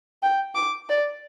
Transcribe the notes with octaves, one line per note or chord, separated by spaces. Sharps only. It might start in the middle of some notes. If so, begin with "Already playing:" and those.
G5
D6
D5